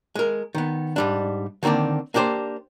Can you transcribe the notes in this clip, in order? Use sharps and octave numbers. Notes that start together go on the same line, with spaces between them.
G#3 A#4
D#3 B3
G#2 G3 D4
D3 D#3 A#3 C4 D4
A#3 D4 G4 G#4 C5